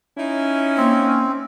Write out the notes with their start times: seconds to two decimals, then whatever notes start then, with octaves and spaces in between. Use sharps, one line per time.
0.18 C#4 D#4 E4
0.77 A#3 C4